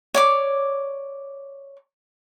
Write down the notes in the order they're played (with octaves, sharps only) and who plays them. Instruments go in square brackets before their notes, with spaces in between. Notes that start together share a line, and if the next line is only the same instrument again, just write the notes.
[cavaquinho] C#5 D5 D6